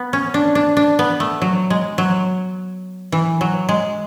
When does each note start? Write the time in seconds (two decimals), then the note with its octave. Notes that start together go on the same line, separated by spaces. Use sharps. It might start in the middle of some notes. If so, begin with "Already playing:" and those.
Already playing: B3
0.13 C#4
0.34 D4
0.55 D4
0.77 D4
0.99 B3
1.20 A3
1.42 F#3
1.70 G#3
1.98 F#3
3.12 E3
3.41 F#3
3.69 G#3